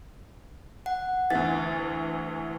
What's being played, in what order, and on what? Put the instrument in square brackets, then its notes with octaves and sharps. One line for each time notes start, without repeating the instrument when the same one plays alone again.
[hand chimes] F#5
[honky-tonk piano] D2 E3 [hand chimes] A6